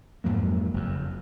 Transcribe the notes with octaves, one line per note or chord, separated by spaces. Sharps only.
F2 G#2 F#3 A#3
F#1 F2